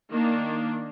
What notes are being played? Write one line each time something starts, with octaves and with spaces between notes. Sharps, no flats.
D#3 A#3 D4